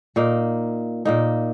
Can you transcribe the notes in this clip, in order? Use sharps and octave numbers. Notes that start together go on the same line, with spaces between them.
A#2 A#3 D#4
A#2 A#3 D#4